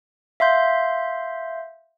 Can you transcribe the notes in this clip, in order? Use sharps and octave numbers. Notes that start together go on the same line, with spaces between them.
E5 F5 C6 G6